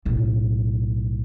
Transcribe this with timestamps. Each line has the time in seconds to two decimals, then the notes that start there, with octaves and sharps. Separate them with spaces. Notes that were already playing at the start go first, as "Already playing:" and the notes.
0.05 B1 A2